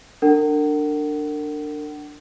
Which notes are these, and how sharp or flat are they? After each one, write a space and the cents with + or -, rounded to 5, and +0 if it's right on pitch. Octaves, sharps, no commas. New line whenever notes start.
D4 +10 A#4 -40 F#5 +40